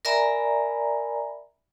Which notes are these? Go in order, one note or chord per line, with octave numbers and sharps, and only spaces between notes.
A#4 D5 E5 G#5 A#5 B5